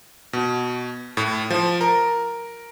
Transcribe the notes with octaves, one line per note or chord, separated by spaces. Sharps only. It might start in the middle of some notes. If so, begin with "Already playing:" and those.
B2
A2
F3
A#4